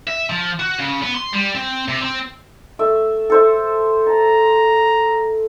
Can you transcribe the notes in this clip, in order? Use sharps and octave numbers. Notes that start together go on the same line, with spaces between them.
E5
F3
F#4
C#3
B3
C6
G3
C4
C3
C4
A3 E5
A4 C5 E5
A5 A#5